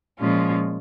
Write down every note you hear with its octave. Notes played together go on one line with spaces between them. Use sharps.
A#2 F3 G#3 C#4 F4